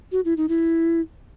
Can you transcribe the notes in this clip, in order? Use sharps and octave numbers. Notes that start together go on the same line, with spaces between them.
F#4
E4
D#4
E4